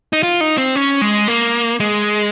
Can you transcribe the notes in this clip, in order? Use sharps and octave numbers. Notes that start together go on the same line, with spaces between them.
D#4
F4
D#4
C4
C#4
G#3
A#3
G#3